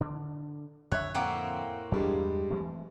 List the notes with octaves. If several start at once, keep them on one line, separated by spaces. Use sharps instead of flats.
D3 D4
F2 D3 C#5 E5 F#6
A2 A#3 C4 F#5
E2 G2 G3 G#3
E3 A3 C4